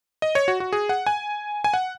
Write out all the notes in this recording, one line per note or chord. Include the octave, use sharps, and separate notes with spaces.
D#5
C#5
F#4
F#4
G#4
F#5
G#5
G#5
F#5